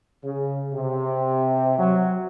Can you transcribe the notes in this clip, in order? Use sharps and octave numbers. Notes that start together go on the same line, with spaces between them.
C#3
C3
F#3